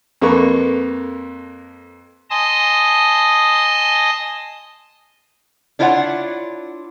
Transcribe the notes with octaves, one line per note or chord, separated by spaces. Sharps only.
F2 A#3 A4 B4 C#6
D#5 G#5 A5 C6 D#6
D4 E4 F4 C#5 D#5 F#5